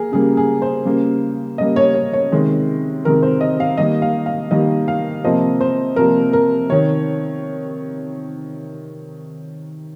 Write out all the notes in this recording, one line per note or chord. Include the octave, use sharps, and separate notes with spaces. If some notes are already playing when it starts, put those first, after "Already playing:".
Already playing: A#3 G#4 A#4
C#3 G3 A#3 G#4
G#4
C5
C#3 G3 A#3
C#3 G3 A#3 D#5
C#5
C#5
C#5
C3 D#3 G#3
C3 D#3 G#3 A#4
C5
D#5
F5
D#3 G3 A#3 D#5
F5
F5
D#3 G3 A#3 D#5
F5
C3 F3 A#3 D#5
C5
C3 F3 A#3 A#4
A#4
C3 D#3 C#5